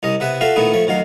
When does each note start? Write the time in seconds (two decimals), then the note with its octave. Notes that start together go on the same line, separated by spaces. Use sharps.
0.03 C2 C#4 D#5
0.20 C3 B3 E5 F#5
0.41 F4 F#4 A4 E5 F5
0.56 A#2 D#3 A3 B3 D#4 E4
0.73 F3 A3 C#5
0.87 D2 D#3 F#3 F5